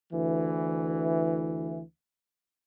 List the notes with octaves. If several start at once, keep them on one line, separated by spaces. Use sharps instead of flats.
D2 E3